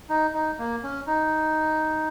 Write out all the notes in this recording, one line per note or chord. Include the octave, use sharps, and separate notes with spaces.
D#4
D#4
A#3
C#4
D#4